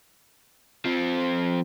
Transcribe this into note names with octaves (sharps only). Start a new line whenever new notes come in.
F3 C4